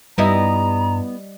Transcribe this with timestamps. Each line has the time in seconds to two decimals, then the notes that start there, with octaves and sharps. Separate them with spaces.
0.18 G2 G3 B3 D#4 E4 D#5 A#5